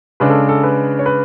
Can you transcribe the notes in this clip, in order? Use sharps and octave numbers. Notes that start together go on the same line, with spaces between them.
C#3 G#3 D4 B4
A4
A4
B4
C#5
B4